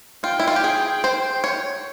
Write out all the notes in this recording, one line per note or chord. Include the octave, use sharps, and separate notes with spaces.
F4 G5
E4
F4
G4
G#4
C5
C#5